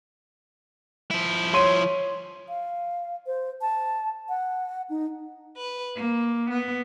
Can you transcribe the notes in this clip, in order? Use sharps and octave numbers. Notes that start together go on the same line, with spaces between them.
F3 E4
C#5 C6 D#7
F5
C5
A5
F#5
D#4
B4
A#3
B3